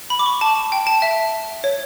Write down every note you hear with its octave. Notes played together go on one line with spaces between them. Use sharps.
B5
D6
C#6
A5
G5
A5
E5
C#5